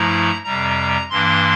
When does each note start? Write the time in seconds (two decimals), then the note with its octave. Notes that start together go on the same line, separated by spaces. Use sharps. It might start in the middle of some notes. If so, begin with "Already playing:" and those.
Already playing: G2 F3 A3 E4 A#5
0.44 F2 C3 G3 A#5
1.10 G2 E3 A#3 D4 C6